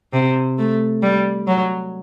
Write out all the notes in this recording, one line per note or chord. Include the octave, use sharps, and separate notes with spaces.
C3
A3
G3
F#3